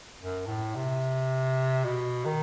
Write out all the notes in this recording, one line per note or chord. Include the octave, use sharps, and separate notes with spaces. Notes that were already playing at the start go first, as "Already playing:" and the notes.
F#2
A2
C3
B2
D#3